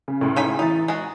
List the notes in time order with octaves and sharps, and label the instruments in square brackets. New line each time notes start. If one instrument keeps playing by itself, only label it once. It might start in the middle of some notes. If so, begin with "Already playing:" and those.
[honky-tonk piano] C#3
C#2 A2
[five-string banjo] D#4 G#5 B5
[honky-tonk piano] E3 E4 A6 [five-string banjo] D#4
[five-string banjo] G#3 F#4